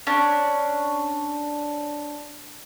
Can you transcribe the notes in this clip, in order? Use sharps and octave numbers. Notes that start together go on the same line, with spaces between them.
C#4 D4